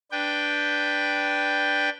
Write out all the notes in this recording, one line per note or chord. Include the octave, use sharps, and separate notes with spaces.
D4 B4 G5